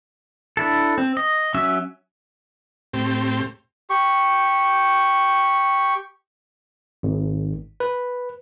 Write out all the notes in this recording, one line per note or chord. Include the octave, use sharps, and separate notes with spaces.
D4 E4 A4
C4
D#5
F#3 C#4 E5 E6
A2 C4 G4
G4 C#6
G#1
B4